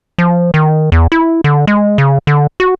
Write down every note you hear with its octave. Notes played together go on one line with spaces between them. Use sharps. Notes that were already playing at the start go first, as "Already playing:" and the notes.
F3
D#3
E2
E4
D3
G#3
C#3
D3
F#4